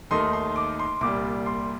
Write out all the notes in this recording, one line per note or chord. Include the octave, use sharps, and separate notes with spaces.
D#2 D#3 A3 D#4 C6
C6
D6
C6
C2 A#2 G3 D6
C6